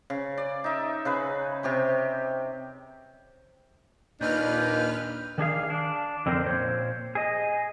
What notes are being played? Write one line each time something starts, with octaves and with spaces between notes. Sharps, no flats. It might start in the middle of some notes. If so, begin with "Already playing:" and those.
C#3
D5
D#4 E5
C#3 G#4 B4
C3 G4 C#6
D#2 A#2 D4 B4 D#5 F6 G6
D#3 D4 G#4 F5
D4
F2 D3 C4 A#4 C5
A#2 C5 C#5
G#4 D#5